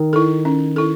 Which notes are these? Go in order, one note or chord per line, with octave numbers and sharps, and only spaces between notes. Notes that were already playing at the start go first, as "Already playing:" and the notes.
Already playing: D#3
E4 A4
C#4
E4 A4